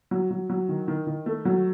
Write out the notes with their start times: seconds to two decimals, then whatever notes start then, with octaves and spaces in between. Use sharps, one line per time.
0.11 F#3
0.31 F#3
0.50 F#3
0.69 D#3
0.88 D#3
1.07 D#3
1.26 A3
1.45 F#3